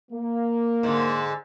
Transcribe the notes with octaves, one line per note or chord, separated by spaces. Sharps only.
A#3
G#2 D3